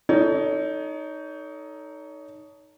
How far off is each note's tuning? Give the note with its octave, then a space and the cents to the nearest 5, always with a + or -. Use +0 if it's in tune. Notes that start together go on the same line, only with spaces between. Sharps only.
D#4 +0 A4 +5 C#5 +30